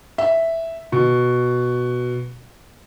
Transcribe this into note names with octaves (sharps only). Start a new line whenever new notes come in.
E5
B2